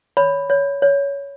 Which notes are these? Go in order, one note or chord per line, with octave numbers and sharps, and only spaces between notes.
C#5 B5
C#5
C#5